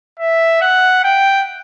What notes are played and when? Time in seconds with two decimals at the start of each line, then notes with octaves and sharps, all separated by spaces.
0.19 E5
0.61 F#5
1.04 G5